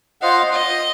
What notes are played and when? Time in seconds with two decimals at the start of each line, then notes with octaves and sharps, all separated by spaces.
0.21 F4 C5 D#5 F5 F#5
0.52 D#5